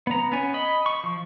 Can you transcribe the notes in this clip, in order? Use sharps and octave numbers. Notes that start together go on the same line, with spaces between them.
B3 A#5
B3 C#4 G#5
D#5 B5
C#6
F3